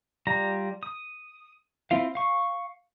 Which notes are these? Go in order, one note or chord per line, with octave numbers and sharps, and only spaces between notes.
G3 F4 A#5
D#6
C4 E4 F4 F5
F5 C#6